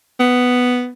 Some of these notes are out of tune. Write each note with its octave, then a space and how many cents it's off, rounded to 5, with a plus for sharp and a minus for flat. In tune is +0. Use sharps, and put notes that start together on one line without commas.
B3 +5